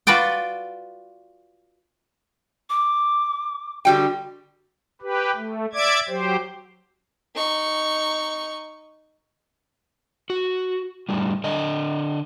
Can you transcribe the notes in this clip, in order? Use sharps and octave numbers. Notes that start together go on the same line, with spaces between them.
F4 F#4 B4 D5 G5
D6
D3 G3 F#4 G5
G4 B4
A3
D5 E5 D6 G#6
F#3 G4 C5
D#4 C#6
F#4
A2 D3 G3
D3 D4 D#5